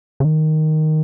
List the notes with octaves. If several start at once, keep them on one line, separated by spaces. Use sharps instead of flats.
C#3
D#3